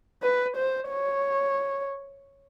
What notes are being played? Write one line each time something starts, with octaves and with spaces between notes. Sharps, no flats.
B4
C5
C#5